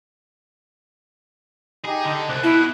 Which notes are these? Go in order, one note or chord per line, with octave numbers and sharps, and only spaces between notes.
D#4 G4 G#4
D3
C2 F#6
B2 E4